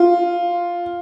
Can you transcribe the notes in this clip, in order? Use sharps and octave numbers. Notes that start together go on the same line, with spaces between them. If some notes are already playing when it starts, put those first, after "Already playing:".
Already playing: F4